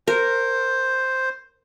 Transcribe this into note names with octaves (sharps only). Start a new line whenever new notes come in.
A#4 C5